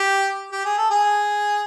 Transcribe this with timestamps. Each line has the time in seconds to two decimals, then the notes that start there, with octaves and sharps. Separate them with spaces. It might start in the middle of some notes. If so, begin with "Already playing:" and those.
Already playing: G4
0.52 G4
0.65 G#4
0.78 A4
0.90 G#4